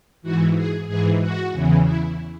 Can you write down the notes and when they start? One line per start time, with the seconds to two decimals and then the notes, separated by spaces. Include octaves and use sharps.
0.22 G#2 E3 F#4
0.56 G#4
0.87 G#2 E3 G#4
1.19 F#4
1.52 E2 C#3 E3
1.84 E4